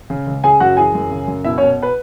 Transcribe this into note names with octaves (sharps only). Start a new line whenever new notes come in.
C#3
C#2
C#3 G#4 G#5
F#2 F#4 F#5
E3 G#4 G#5
F#2
C#3
F#2
B2 E4 E5
C#4 C#5
B2
B4